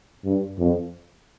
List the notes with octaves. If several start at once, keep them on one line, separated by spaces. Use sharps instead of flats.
G2
F2